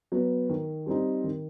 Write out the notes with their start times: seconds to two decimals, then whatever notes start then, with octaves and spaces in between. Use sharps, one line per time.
0.12 F#3 B3
0.49 D#3
0.86 G3 C4 D#4
1.24 D#3